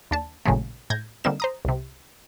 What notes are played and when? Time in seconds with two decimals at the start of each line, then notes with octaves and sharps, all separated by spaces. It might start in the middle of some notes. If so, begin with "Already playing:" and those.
0.11 D#2 D4 A5
0.46 A1 A#2 C#3 F#3 G#3 A3
0.90 A2 G6 G#6 A#6
1.24 D3 G3 A#3 C4 D#4 E7
1.40 C5 A#5 D#6
1.65 C2 C3